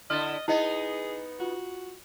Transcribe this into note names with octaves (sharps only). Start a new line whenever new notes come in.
D3 E4 D#5 F6 A6
B3 D#4 E4 G#4 D#5
F4 F#4